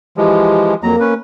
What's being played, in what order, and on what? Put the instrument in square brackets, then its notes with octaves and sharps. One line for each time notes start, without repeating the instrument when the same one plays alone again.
[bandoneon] E3 F3 G#3 [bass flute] G4
[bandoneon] F2 F#3 A#5 [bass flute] A#3
[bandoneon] C#4 B4